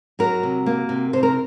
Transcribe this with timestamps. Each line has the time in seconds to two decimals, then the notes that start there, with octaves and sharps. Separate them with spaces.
0.19 F#3 F#4 A#4
0.43 C3
0.66 A#3
0.89 C3
1.13 C3 C5
1.23 A#4